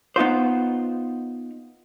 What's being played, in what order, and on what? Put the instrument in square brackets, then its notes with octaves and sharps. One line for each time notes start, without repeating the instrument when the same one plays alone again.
[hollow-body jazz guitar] B3 D#4 F4 C5